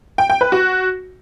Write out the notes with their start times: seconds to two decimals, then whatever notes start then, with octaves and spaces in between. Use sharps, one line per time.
0.18 G5
0.30 G5
0.41 B4
0.52 F#4